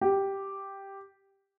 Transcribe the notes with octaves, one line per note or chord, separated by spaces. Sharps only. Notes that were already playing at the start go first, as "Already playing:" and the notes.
G4